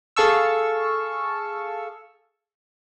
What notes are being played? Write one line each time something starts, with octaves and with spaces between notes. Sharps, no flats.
G#4 A4 F5 A5 C#6 E6